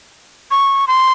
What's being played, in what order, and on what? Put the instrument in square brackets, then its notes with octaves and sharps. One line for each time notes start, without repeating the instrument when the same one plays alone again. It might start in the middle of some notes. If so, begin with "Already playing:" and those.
[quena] C#6
C6